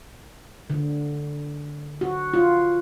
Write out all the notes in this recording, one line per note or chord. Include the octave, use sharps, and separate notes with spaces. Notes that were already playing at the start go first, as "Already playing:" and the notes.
D3
F#4
F4